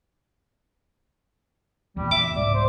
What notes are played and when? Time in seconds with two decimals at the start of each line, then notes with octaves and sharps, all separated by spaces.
1.97 E2 A#2 G3
2.11 E5 D6
2.36 C2 G#2 D5
2.54 C5